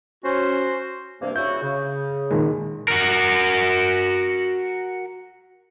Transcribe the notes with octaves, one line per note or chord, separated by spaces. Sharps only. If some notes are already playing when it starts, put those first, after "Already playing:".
C#4 F#4 C5
G2 C3 A#3
C#3 E4 F#4 G6
C#3
A#2 D#3 G#3
F#4 A#4